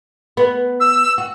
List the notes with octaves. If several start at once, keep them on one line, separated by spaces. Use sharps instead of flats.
B3
E6
F#4